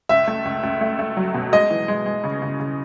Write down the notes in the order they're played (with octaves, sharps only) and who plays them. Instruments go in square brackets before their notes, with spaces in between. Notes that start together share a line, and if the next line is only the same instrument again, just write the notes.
[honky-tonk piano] C#2 [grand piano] E5
[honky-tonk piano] A3
C#2
C#2
A3
A3
F#3
B2
[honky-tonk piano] G#3 [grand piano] D#5
[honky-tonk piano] E3
G#3
G#3
C#3
C#3
C#3